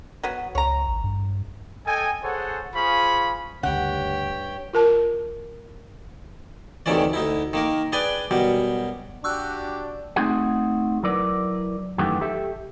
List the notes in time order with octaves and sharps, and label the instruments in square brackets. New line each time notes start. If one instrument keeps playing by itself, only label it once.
[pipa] F#3 B3 F#4
[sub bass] C#2 [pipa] C#5 A#5
[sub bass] A1
G2
[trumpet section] A4 D#5 G5 G#5
G#4 A4 C5 C#5 F#5
F4 G#4 C5 F5 B5 C#6
[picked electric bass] D2 C#3 [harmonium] G2 C#5 [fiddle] G4 [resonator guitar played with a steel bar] F#5
[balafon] F4 A#4 A5
[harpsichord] D2 C3 D#3 E3 C#4 D5
D2 D#4 E4
D#3 A#3 A#4
D4 G#4 B4 D5 G5 G#5
F#2 B2 G3
[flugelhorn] D4 [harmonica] F#4 G4 [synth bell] C#6 E6 F#6
[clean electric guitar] A3 C4 D#4 F#4 G#4 F#5
F#3 E4 A#4 B4 D5
F#2 D#3 E3 A3 F#4 G4
G4 A4 E5